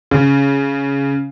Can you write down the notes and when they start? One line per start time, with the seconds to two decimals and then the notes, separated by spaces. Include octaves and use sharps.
0.11 C#3